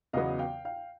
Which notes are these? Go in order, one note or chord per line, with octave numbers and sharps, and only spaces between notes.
E2 C#3 F#3 B3 D#5 F5
F5 G5
F5 G5